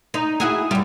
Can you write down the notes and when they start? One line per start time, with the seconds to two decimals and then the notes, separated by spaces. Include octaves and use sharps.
0.14 D#4
0.40 E4 F#4 G#4
0.71 F#2 G3